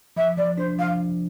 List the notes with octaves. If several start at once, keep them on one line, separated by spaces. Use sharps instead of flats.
F3 E5
F3 D5
D4 C5
F3 F5